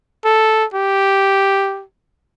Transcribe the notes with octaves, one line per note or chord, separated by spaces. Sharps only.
A4
G4